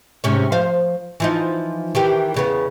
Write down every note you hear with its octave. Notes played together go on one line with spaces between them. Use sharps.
G#2 C3 C#4
F3 C5 F5
E3 F3 D#4
D#3 E3 G4
E2 C#3 B3